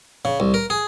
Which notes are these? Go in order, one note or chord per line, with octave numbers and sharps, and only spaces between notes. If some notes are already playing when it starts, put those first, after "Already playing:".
C#3
C2
A#4
G#4